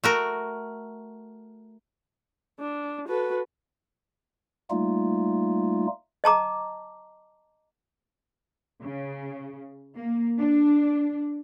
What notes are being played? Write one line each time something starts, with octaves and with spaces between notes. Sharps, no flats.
A3 F#4 A#4
D4
F#4 A4 B4
G3 A3 A#3 D#4 F4
D#5 A5 A#5 D6
C#3
A#3
D4